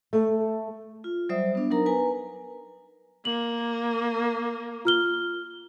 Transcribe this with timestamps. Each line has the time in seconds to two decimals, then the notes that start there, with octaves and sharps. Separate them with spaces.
0.13 A3
1.04 F4
1.29 F#3 G3 C5 D5 E5 D#6
1.55 B3 D4
1.71 F#3 D#4 A#4 A#5
1.86 B4 G#5 A#5
3.25 A#3 F#7
4.85 F4 F6 G7